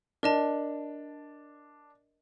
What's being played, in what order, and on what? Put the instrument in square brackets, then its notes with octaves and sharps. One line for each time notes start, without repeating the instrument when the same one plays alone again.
[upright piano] D4 [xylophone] A#4 D#5 A5